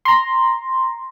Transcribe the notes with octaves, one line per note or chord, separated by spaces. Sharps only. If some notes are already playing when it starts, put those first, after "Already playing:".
A#5 C6